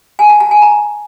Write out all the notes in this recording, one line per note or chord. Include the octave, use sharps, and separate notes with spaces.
G#5
A5
A5
G#5
A#5